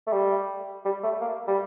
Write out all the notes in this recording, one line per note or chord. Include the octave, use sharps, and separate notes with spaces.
A3
G3
G3
A3
A#3
G3